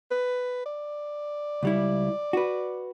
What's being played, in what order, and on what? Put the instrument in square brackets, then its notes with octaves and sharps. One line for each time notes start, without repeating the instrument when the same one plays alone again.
[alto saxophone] B4
D5
[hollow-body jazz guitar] C#2 G3 E4
F#4 B4